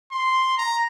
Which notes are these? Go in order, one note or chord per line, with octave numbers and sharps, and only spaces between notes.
C6
A#5